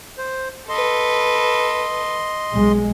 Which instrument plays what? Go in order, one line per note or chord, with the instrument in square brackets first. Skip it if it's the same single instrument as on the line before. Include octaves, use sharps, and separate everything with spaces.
[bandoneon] C5
[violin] A4 B4 [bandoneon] D#5 C6
[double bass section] B1 G#3